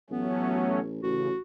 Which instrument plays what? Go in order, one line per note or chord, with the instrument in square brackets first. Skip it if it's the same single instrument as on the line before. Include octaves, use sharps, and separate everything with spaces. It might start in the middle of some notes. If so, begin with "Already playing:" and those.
[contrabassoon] A1 [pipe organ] F#3 A3 C#4 [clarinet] B3
[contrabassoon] A1 [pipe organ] C#3 [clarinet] F#4